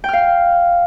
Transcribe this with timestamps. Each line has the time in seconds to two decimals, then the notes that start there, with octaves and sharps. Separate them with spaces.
0.04 G5
0.09 F6
0.13 F5